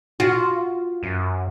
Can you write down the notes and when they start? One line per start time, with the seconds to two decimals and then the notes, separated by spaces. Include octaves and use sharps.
0.20 F4 F#4
1.03 F#2